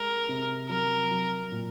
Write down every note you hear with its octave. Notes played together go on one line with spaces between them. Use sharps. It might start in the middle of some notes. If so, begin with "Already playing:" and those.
Already playing: G#3 A#4
C3
F#3 A#4
F#3
A#2